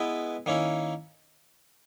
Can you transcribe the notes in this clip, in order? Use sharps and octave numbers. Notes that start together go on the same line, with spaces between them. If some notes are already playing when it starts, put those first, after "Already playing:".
Already playing: G#3 B3 E4 B4
D#3 A#3 C#4 E4